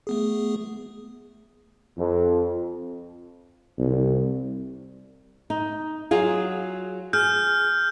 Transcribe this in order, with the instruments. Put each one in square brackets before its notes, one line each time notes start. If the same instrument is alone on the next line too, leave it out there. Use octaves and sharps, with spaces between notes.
[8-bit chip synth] A3 B3 G#4
[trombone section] F2
[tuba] C2
[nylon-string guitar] D#4
F#3 F4 G#4
[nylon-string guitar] G#4 [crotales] F6 G6